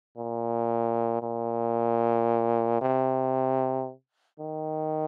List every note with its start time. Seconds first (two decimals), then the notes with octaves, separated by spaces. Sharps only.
0.18 A#2
1.22 A#2
2.81 C3
4.39 D#3